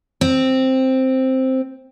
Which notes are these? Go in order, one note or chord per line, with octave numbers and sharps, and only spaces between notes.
C4